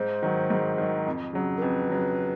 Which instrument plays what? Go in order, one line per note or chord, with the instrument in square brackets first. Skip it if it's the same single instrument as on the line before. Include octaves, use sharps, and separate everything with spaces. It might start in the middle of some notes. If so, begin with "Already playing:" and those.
Already playing: [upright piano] G#2 [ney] C5
[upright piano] D#3 F#3
G#2
D#3 F#3
F2
C#3 F#3
[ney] A#4
[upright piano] F2 [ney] B4
[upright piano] C#3 F#3